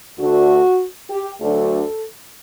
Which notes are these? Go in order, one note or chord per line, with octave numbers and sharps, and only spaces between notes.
D2 D3 A3 D4 F#4
G4
D2 D3 F#3 A3 D4 A4